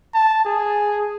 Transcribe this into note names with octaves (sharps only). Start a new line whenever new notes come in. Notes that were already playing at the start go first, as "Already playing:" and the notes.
A5
G#4